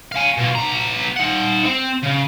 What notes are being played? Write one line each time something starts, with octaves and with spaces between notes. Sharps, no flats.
F5 G#5
B2 F4
B3 A#5
D#4 F#5
C4
C#3